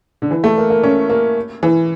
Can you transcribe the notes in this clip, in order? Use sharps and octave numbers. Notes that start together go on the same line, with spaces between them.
D3
E3
A3
A#3
A#3
C#4
A#3
E3